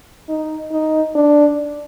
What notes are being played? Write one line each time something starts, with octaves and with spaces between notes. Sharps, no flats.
D#4
D#4
D4